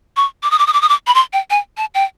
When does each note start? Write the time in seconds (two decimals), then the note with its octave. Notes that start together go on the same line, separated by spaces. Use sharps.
0.17 C#6
0.43 D6
0.51 D#6
0.59 D6
0.67 D#6
0.73 D6
0.82 D#6
0.89 D6
1.07 B5
1.15 C6
1.33 G5
1.50 G#5
1.77 A5
1.95 G5